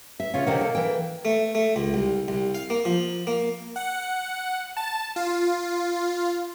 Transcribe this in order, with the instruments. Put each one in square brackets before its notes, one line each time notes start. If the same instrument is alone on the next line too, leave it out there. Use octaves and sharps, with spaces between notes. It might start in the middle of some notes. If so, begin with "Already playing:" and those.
[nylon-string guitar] E5
[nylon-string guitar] C#3 C#4 [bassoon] F4
[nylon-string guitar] C3 D#3 F#5 [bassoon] A#3
[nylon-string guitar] A4
E3 G5
[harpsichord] A3
A3
C#2
C2
C2
F5
A#3
F3
A#3
[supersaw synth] F#5
A5
F4